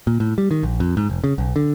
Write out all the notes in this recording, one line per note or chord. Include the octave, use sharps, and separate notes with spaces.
A#2
A2
G3
D#3
A#1
F2
G#2
F1
C#3
B1
D3